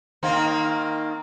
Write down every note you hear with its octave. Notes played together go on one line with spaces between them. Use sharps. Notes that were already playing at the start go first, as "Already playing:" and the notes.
D#3 A#3 C4